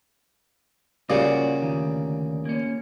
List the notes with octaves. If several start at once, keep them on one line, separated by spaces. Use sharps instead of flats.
A#2 C#3 G3 F4 F#4 D5
D2 D#3
A#3 C#4